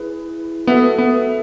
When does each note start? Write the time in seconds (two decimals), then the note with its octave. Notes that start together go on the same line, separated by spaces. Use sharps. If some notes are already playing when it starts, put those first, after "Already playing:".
Already playing: E4 G#4 B4
0.67 B3 F#4 A4 E5
0.98 B3